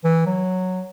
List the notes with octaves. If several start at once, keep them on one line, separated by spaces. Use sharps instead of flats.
E3
F#3